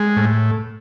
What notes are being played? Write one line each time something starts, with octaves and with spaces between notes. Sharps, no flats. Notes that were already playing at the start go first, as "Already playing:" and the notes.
Already playing: G#3
A2